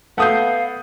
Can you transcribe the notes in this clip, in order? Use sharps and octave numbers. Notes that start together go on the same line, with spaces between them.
A3 B3 F5 F#5 D#6 G6